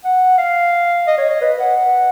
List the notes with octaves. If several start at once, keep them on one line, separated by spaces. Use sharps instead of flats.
F#5
F5
D#5
C#5
D#5
B4
F#5
F#5